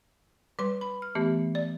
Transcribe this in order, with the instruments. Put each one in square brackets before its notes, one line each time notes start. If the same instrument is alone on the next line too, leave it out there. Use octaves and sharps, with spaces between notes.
[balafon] G3 C6 [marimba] B4
[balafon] B5
[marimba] F6
[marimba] E3 A3 B3 [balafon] G4
[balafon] D5